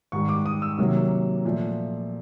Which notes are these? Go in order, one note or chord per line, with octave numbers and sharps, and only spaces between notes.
G#2 D#3 G3 C#6
D6
D#6
E6
C3 D#3 F#3 A#3
A#2 F3 A3